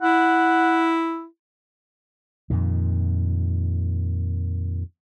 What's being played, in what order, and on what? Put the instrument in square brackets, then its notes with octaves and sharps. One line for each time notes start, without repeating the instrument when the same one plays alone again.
[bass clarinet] E4 [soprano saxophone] F#5
[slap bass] F2 A#2 D#3